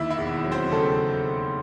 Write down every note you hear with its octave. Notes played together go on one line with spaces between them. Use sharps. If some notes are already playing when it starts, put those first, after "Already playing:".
Already playing: D#2 E4 E5
E4 E5
E1
F#3
C4 C5
C#3 A3 A4